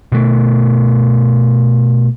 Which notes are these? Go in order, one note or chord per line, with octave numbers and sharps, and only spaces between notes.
B2 A3